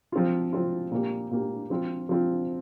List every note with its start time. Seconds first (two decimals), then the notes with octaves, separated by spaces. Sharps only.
0.12 F3 C4 F4
0.53 F3 C4 F4
0.91 A#2 A#3 G4
1.31 A#2 A#3 G4
1.70 F3 C4 F4
2.09 F3 C4 F4